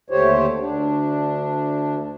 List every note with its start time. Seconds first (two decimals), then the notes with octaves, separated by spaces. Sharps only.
0.10 D#2 D3 A3 G4 C5 C#5
0.58 D2 D4